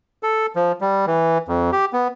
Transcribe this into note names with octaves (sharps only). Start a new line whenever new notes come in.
A4
F3
G3
E3
F2
G4
B3